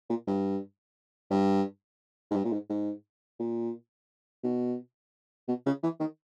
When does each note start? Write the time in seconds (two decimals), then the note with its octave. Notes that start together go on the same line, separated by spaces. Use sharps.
0.09 A#2
0.27 G2
1.31 G2
2.31 G#2
2.35 G2
2.45 A#2
2.53 G#2
2.70 G#2
3.39 A#2
4.44 B2
5.48 B2
5.66 C#3
5.83 E3
6.00 D#3